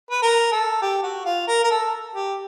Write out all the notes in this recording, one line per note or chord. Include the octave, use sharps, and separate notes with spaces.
B4
A#4
A4
G4
F#4
F4
A#4
A#4
A4
G4